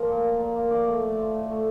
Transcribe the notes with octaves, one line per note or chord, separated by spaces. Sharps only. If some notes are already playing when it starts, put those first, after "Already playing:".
Already playing: F3 A#3 A#4 D5
A#2
A#2
A#2
A#3
F3 D5
A3
A2
F3
A2
A3